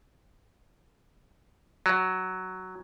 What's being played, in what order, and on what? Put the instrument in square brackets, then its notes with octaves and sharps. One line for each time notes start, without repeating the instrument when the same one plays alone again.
[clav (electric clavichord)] F#3